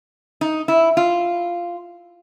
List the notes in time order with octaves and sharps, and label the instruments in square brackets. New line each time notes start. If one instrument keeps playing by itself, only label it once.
[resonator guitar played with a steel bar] D#4
E4
F4